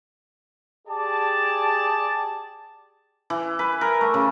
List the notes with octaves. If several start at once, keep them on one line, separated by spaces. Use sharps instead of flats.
G4 G#4 D5 A5
E3
B4
A#4
A3
C#3